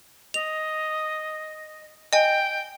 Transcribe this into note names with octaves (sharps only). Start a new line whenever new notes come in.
D#5 F7
D#5 G5 G#5